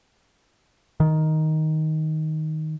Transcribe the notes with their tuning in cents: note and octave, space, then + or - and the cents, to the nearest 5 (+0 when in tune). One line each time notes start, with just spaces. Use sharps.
D#3 +5